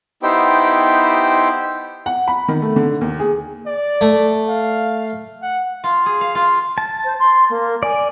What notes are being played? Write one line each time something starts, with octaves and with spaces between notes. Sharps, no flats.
B3 D#4 E4 G4 C5 G5
F#5
B5
D#3
A3
D3
D#2
G#4
D5
A3
F5
F#5
F4
G#4
F5
F4
A5
C5
C6
A#3
D5 G#5